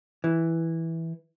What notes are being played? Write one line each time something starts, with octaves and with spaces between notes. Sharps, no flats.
E3